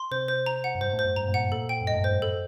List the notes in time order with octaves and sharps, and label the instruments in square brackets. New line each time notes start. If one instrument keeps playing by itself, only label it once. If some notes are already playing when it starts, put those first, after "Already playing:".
Already playing: [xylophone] C6
[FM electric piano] C3 [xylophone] C5
[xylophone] C5
A#5
F#5
[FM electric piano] F#2
[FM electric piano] G2 [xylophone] C5
[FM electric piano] A2
[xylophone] C5
[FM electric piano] F#2
[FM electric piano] G2 [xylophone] A#5
[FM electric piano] A#2
[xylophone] F#5
[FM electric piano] A2
[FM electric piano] A#2 [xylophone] A4
[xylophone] G5
[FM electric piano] F#2
[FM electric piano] G2 [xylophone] D#5
[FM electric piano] A2
G2
[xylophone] C5
[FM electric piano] F#2
[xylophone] A4